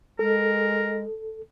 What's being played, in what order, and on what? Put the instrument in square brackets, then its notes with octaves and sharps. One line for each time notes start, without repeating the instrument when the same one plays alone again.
[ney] G#3 [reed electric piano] A4 [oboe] A#4